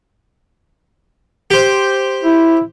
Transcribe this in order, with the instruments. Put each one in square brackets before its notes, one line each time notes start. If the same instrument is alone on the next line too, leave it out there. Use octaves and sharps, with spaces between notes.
[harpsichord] G4 C5
[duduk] E4